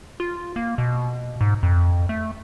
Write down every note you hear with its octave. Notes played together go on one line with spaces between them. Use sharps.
F4
A#3
B2
G#2
F2
A3